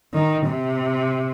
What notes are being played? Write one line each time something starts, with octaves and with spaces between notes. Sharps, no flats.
D#3
C3